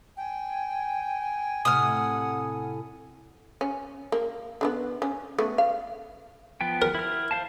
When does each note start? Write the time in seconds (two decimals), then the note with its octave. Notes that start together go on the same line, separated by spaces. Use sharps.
0.17 G5 G#5
1.65 A2 C3 F#5 D#6 F6
3.61 C#4
4.12 A#3
4.61 D3 G#3 B3
5.02 C#4
5.38 A3 B3
5.58 F5
6.61 F3 B3 G5
6.82 A#4
6.95 E4 F6
7.31 C5 F5 A5